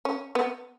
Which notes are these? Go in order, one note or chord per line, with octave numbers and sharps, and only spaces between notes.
C#4
B3